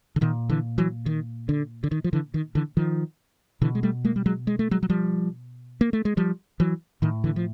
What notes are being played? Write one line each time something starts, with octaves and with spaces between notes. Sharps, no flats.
D3
A#2 D#3
D3 E3
E3 F#3
D#3
D3
D3
D#3
F3
D3 E3
D#3
D3 E3
D#3 F3
B2 D3 E3
G#3
G3 A3
G#3 A#3
G3
F#3 G#3
G#3
A3
F#3 G#3
F#3
F3 G3
A#3
A3
G#3
F3 G3
E3 F#3
A2 D#3
D3 E3
F3